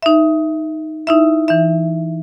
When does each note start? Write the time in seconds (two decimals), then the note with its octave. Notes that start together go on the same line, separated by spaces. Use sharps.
0.03 D#4 E5
1.07 D#4 E4 E5
1.48 E3 E5